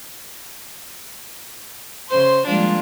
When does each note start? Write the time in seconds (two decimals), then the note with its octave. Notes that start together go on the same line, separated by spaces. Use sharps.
2.09 C#3 C5 C6
2.47 F3 G3 G#3 A#3 D4 F4